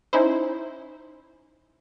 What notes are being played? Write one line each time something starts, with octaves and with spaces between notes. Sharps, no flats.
C#4 D#4 E4 C5